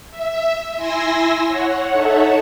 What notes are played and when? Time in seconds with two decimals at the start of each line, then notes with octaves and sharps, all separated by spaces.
0.10 E5
0.76 E4 G#5 C6 E6 A#6
1.48 C#5 F#5
1.92 D#4 A4 C#5 E5 F#5